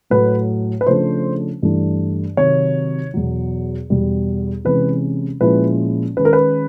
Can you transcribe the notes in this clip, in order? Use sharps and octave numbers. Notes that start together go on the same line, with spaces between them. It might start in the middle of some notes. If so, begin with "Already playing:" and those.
A2 F#3 A3 B4
B4
C#3 F3 A3 D4 C5
G2 E3 A3 D4
C3 D#3 F#3 C#5
E2 B2 F#3
E2 B2 G3
C3 E3 G#3 C#4 B4
A#2 F3 G#3 C#4 E4 B4
D#3 G#3 C#4 B4
A#4
B4